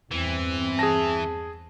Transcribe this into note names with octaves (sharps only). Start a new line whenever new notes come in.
E2 G2 E3 C4
G#4 A5 A#6